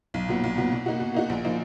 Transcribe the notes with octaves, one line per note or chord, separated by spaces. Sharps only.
B1
A#2 F#3 B3
B1
A#2 F#3 B3
B2
A#3 D#4 F#4
B2
A#3 D#4 F#4
A#1
F3 A#3 D#4